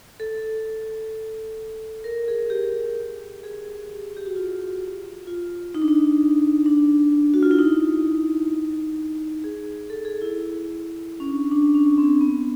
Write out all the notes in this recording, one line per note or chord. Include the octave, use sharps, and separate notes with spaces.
A4
A#4
G#4
G4
G#4
G4
F#4
F4
F4
D#4
D4
D#4
D4
F#4
F4
E4
D#4
G#4
A4
G#4
E4
C#4
D4
D4
C#4
C4
B3